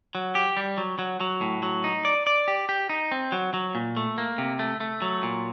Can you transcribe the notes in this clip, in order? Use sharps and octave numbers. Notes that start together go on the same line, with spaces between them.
F#3
G4
G3
F#3
F#3
F#3
A2
F#3
D#4
D5
D5
G4
G4
D#4
C4
F#3
F#3
A#2
A3
A#3
C3
A3
A3
F#3
A#2